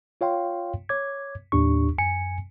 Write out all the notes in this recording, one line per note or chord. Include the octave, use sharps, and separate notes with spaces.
F4 C#5 F5 G5 C6
C#5 D6 G#6
D#2 A2 D4 G4 C#6
F#2 G#5 C#7